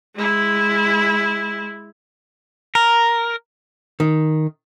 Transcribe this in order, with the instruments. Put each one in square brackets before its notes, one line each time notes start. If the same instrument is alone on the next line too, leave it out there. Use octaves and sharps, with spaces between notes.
[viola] G#3 E4
[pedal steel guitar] A#4
[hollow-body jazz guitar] D#3